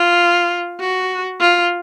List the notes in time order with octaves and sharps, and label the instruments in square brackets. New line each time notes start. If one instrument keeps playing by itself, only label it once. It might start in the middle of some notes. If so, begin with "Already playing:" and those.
Already playing: [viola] F4
F#4
F4